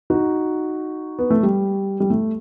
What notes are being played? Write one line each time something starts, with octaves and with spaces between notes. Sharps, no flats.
D#4 F#4
B3
A3
G3
G3
A3